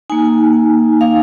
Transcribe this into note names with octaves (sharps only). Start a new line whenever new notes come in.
A#3 D#4 G#5
F5